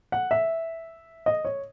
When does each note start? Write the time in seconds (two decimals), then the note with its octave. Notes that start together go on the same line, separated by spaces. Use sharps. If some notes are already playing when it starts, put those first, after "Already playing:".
0.12 F#5
0.31 E5
1.26 D#5
1.45 C#5